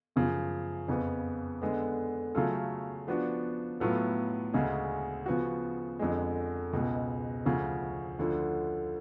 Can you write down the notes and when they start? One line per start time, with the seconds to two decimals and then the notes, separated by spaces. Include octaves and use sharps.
0.16 F#2 C#3 F3
0.88 F2 C#3 F3 B3
1.62 D3 G#3 B3
2.35 C#3 F#3 A3 F4 A4
3.08 F3 B3 D4 F#4
3.80 A2 F#3 B3 F4 A4
4.54 D2 C#3 G#3
5.26 C#3 F3 B3 F#4
5.99 F2 D3 G#3
6.73 C#2 B2 G#3
7.45 D2 C#3 F3
8.19 D2 D3 F3